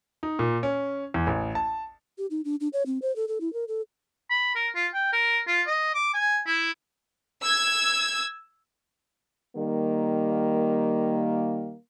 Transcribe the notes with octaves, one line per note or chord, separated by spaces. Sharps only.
D#4
A#2
C#4
E2
A1
A5
G4
D#4
D4
D4
C#5
C4
C5
A4
A4
E4
A#4
A4
B5
A#4
F4
G5
A#4
F4
D#5
D6
G#5
E4
E6 G#6
D#3 G3 A#3